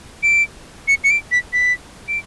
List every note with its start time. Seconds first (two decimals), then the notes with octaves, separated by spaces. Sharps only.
0.23 D7
0.88 C#7
1.04 C#7
1.10 D7
1.32 B6
1.53 B6
2.08 D7